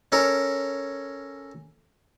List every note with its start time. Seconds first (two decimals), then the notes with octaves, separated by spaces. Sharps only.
0.12 C#4 A4 A#4 C#5